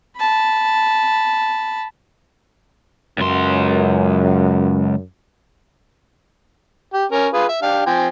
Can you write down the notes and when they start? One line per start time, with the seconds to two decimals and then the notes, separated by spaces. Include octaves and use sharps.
0.17 A5 B5
3.18 C#2 F#2 C6
6.94 G4
7.12 C#4 A#4
7.33 F4 G#4 B4
7.49 E5
7.62 D4 G4 F5
7.86 F3 C4 G#5